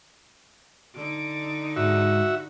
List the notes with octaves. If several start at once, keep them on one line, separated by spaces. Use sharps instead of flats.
D3 D#4 D7
G#2 F#4 E5